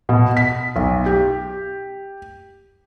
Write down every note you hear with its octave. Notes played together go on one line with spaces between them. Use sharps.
B2
B6
B1
G4